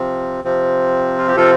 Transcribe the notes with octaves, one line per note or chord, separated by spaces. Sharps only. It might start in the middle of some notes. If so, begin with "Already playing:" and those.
Already playing: C3 F3 C4
C3 F3 C4
F4
G4
C3 F3 C4 F4 A4